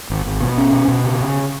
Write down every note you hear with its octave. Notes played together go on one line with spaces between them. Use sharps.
G#1
G#1
B2
C#4
B2
B2
C#3
C#3